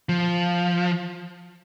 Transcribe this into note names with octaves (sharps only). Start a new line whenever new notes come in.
F3